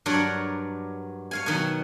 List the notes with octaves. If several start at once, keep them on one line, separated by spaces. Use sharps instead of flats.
G2 F#3 A#4 C#5 D5 F#5
C#5 F5 G#5
B2 D#3 F#3